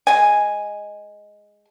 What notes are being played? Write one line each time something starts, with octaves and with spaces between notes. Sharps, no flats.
G#3 G#5